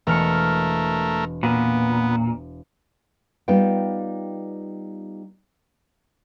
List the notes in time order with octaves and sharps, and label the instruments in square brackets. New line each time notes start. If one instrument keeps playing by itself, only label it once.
[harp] E1 F6 C#7 [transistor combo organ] A3 A#4
[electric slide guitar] A#2 [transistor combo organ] B3
[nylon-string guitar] G3 B3 D#4 F4 G5